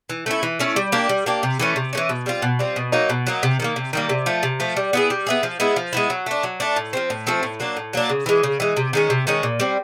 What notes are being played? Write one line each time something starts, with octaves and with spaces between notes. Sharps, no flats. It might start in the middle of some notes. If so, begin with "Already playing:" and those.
E3
A3 C#4 E4
E3
A3 C#4 E4
G3
A#3 D4 G4
G3
A#3 D4 G4
C3
E3 A3 C#4
C3
E3 A3 C#4
B2
G3 C4 F4
B2
G3 C4 F4
B2
F#3 A#3 D#4
B2
F#3 A#3 D#4
C3
D#3 G3 A#3
C3
D#3 G3 A#3
C3
F3 A3
C3
F3 A3
G3
B3 E4 G#4
G3
B3 E4 G#4
F3
G#3 B3 E4
F3
G#3 B3 E4
F#3
A3 D4
F#3
A3 D4
A2
F3 A3 C4
A2
F3 A3 C4
A2
F#3 A#3 D4
A2
F#3 A#3 D4
C#3
E3 G#3
C#3
E3 G#3
C3
D#3 G#3 C#4
C3
D#3 G#3 C#4
A#2
G3 C4